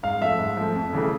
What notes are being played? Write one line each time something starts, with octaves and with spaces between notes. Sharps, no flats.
G#2 F5
F3 A3 E5
G#2
F3 A3
F2
C#3 E3 A3